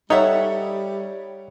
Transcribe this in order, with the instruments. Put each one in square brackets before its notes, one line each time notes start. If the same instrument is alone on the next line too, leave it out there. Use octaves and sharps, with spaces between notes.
[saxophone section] G3 [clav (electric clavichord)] D#4 [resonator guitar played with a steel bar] A4 E5 F#5 [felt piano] C#5